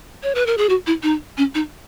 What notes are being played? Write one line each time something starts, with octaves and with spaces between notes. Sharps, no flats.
C#5
B4
A#4
G#4
F#4
E4
D#4
C#4
D#4